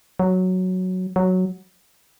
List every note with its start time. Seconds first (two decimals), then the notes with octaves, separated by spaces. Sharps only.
0.19 F#3
1.16 F#3